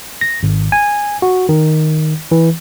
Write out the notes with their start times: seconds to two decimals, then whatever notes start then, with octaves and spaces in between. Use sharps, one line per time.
0.21 A#6
0.43 G#1
0.72 G#5
1.22 F#4
1.49 D#3
2.31 E3